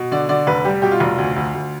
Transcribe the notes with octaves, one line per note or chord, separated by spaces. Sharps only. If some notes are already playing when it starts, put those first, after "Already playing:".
Already playing: B2
D3 D5
D3 D5
F1 B4
G3 G4
B2 G4
F4
F1
D2
D2
D2